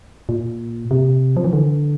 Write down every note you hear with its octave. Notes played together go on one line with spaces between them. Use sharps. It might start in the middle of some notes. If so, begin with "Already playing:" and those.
A#2
C3
F3
E3
D3